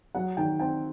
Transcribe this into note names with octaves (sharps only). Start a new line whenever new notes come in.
F#3 F#5
D#3 G5
C4 G5